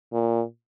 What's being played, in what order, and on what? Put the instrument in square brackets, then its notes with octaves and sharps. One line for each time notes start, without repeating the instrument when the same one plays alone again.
[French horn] A#2